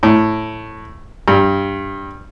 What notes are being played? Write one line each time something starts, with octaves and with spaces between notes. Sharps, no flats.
A2
G2